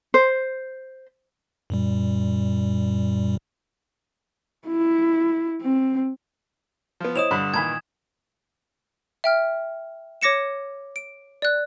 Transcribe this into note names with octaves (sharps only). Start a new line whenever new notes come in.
C5
F#2 A#2 G3
E4
C4
F3 B3
E4 C5 C#5 D#5 D#6 E7 F7
G2 D3 B5
A#2 D#3 E3 G#5 B5 G#6
E5 G5 F6
C#5 D6 A#6 C#7 E7
D7
D5 F#6